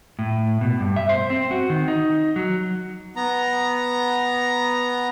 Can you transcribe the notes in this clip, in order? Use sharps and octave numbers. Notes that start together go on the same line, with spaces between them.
A2
B2
G2
E5
C5
C4
F#4
D#3
D#4
F#3
B3 A#5